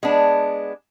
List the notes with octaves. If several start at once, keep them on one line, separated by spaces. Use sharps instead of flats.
G#3 B3 D4